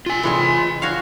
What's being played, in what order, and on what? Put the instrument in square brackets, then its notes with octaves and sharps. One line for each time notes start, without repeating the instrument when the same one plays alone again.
[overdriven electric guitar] F4 G#5
[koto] E3 G#3 C4
F#4 C#5 F5